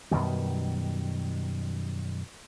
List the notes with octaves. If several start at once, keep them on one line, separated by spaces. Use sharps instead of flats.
F#2 B2 D#3 G3